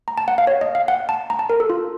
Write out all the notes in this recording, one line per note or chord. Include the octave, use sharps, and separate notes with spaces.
A#5
A5
F#5
F5
C#5
D#5
F5
F#5
A5
A#5
A5
A#4
A4
F4